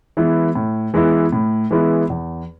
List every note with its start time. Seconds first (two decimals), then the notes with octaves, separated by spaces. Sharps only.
0.17 E3 G#3 B3 E4
0.55 A2
0.94 E3 G#3 B3 E4
1.33 A2
1.71 E3 G#3 B3 E4
2.10 E2